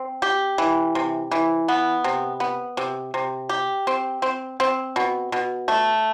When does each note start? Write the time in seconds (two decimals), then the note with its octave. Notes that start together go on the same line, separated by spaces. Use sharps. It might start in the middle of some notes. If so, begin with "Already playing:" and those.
Already playing: C4
0.22 G4
0.58 E3
0.95 C3
1.31 E3
1.68 B3
2.04 C3
2.40 B3
2.77 C3
3.14 C3
3.49 G4
3.87 C4
4.22 C4
4.60 C4
4.96 B2
5.32 B2
5.68 A3